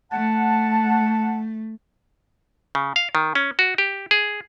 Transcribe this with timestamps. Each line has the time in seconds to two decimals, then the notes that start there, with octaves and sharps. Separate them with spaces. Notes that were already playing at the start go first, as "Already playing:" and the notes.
0.12 A3 F#5 A5
2.75 C#3
2.96 F5
3.15 D#3
3.35 C#4
3.59 F#4
3.78 G4
4.11 G#4